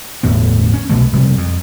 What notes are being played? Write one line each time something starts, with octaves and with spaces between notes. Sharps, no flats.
G1 E2 A2 B3
C#4
C2 B2 E3 A3
F1 C3 G3
F2